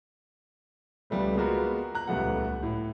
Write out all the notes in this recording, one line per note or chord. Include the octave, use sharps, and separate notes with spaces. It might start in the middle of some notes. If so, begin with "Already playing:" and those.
C#2 G3 A3 B3
G#3 A#3 B3 F4 F#4 A#4
A#5 F#6
D#1 C#2 A3 B3 F#5
A2